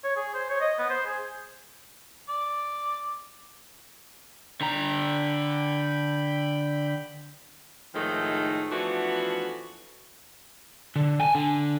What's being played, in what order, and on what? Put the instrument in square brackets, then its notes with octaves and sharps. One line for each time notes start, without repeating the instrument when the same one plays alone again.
[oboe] C#5
G#4
C5
C#5
D#5
B3
C5
G#4
[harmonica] D5
[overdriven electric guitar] D3 A#5 [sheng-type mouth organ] G5 B5
[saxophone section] A2 D#3 F3 G#3 A3 D#4
E3 F3 A3 B3 D4 F#4
[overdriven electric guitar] D3
G5 G#5
D3